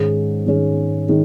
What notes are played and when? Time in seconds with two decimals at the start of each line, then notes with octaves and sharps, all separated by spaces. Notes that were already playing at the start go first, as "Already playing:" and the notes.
Already playing: G#2 D#3 G#3 C#4 G#4
0.46 G#2 D#3 G#3 C#4 G#4
1.08 D#3 G#3 C#4 G#4